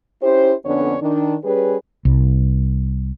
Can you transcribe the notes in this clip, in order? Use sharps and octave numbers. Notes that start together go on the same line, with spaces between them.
C#4 E4 G4 C5
F2 D3 B3 C#4 D4 C#5
D#3 D4
G3 C#4 G4 G#4 B4
C2